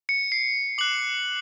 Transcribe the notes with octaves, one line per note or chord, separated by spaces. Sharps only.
C#7
C7
D6 F#6 F#7